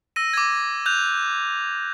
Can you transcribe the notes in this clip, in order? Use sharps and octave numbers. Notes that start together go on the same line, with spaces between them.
E6 A#6 D#7
D6 G#6
F#6 G6 F7